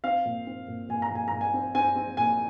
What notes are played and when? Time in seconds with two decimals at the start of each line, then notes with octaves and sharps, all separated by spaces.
0.04 C4 F5
0.25 A#2
0.47 C4
0.68 A#2
0.89 A#2 G#5
1.02 A#5
1.11 A#2 G#5
1.28 A#2 A#5
1.41 G#5
1.54 C4
1.75 C4 G#5
1.96 C4
2.17 A#2 G#5